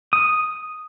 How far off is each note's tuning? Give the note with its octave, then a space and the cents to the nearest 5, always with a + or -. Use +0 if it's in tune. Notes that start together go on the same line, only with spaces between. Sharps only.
D#6 +0